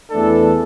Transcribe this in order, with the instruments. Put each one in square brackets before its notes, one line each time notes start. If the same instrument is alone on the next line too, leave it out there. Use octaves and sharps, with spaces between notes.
[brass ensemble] E2 E3 A3 D4 A4